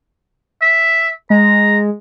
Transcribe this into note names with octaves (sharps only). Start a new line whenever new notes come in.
E5
G#3 A#5